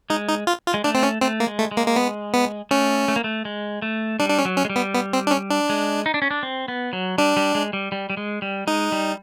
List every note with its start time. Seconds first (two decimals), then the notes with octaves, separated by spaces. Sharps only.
0.10 G#3 D#4
0.29 D#4
0.47 F4
0.66 F4
0.74 G#3
0.84 A3 D4
0.95 C4
1.03 C#4
1.21 A3 C4
1.40 A#3
1.47 G#3
1.59 A3
1.71 G#3
1.77 A#3
1.88 A#3
1.96 B3
2.34 B3
2.71 A3 C#4
3.08 A3
3.16 A#3
3.24 A3
3.45 G#3
3.82 A3
4.19 G3 D4
4.30 D4
4.39 C#4
4.45 F#3
4.57 C#4
4.65 G#3
4.70 G3
4.76 B3
4.94 B3
5.13 C4
5.27 D4
5.31 C#4
5.50 D4
5.69 G#3
6.06 D#4
6.14 D4
6.22 C#4
6.31 D4
6.43 C4
6.68 B3
6.93 F#3
7.18 G3 D4
7.37 G3
7.55 G#3
7.73 G3
7.92 G3
8.10 G3
8.17 G#3
8.42 G3
8.67 G#3 D#4
8.92 G3